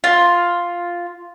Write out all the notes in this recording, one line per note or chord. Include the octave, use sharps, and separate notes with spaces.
F4